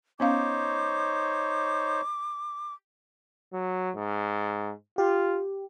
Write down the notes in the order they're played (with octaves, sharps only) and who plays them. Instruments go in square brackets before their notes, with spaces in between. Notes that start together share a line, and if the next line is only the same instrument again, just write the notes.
[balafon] B3 C#4 F5 [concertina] D#4 C5 C#5 [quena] D6
[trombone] F#3
G#2
[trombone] F4 [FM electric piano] G4